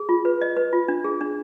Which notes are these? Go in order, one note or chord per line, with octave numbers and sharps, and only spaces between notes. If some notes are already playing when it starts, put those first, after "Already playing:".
Already playing: G#4
F4
B4
D#5
B4
F4
D4
G#4
D4